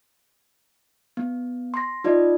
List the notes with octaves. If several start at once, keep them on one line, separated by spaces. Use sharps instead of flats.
B3
C6 A#6
D#4 F4 D5 D#5